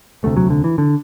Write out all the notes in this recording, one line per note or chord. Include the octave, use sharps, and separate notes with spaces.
E1 D2 C3 A3
F#3
D3
E3
D3